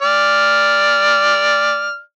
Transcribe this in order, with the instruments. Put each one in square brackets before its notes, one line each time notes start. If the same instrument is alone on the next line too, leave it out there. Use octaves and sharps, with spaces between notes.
[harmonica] D5 F6